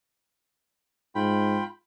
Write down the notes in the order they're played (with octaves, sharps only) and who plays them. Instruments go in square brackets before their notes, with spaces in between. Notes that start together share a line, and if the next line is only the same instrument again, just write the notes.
[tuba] G#2 [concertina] F4 G5 B5